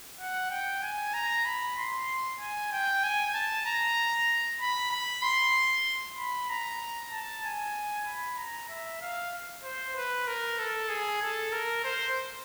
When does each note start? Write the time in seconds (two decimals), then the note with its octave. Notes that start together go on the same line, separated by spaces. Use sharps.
0.20 F#5
0.51 G5
0.83 G#5
1.14 A#5
1.45 B5
1.78 C6
2.40 G#5
2.72 G5
3.04 G#5
3.34 A5
3.66 A#5
4.61 B5
4.91 B5
5.23 C6
6.18 B5
6.49 A#5
7.12 A5
7.44 G#5
8.06 B5
8.37 A#5
8.69 E5
9.01 F5
9.63 C5
9.96 B4
10.28 A#4
10.59 A4
10.89 G#4
11.22 A4
11.52 A#4
11.84 C5